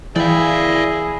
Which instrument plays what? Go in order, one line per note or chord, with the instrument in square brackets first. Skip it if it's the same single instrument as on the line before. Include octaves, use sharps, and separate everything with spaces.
[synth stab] E3 G5 [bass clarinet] E4 [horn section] G#4 [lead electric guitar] D5 F5